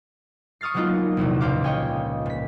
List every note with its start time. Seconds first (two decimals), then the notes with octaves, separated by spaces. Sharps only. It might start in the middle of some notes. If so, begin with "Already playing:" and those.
0.61 C#6 D#6 F6 A6 C7
0.74 F#3 G#3 A#3 B3 D#4 F4
1.17 A#1 E2 C3
1.41 C#2 C5 F5 D6
1.64 C#5 D#5 G5 G#5
2.26 A#2 B6